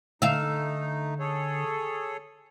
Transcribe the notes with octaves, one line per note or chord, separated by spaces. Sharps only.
D3 A3 D#4 E5 F5
G#4 A4 C#5